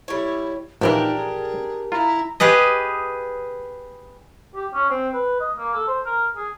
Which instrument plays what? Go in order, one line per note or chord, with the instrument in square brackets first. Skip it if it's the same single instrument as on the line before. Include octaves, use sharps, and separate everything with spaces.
[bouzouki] G3 C#5 [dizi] E4
[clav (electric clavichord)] A#1 A#2 E3 [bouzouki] D4 G4 A#4 [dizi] D#4
[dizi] G#4
[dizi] E4 [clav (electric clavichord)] F4 [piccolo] A#5
[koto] G4 G#4 B4 D#5
[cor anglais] G4
C#4
C4
B4
D#5
A#3
A4
C5
A#4
G#4